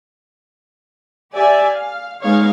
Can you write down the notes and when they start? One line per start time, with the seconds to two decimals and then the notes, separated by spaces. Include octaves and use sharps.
1.34 G4 D5 E5 G#5
1.72 F5
2.22 G#3 B3 D#4 C#5 F5